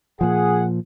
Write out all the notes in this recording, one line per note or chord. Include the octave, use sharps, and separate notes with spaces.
A#2 F3 G#4 F#5